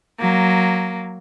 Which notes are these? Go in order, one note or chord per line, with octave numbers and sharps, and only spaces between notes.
F#3 A#3